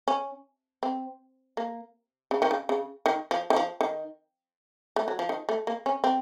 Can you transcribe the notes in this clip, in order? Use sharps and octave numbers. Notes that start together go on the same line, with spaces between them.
C#4
C4
A#3
C#3
D#3
C#3
C#3
D#3
F3
D#3
F3
D#3
A3
F#3
F3
D#3
A3
A#3
C#4
C4